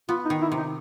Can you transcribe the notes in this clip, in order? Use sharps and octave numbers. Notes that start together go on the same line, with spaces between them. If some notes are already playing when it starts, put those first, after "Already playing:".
B3 F4
D#4
D#3
E4
C3
D#4